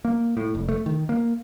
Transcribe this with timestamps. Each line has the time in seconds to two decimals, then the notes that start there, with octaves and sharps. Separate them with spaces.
0.05 A#3
0.37 A2
0.55 F1
0.69 A3
0.86 D#3
1.09 A#3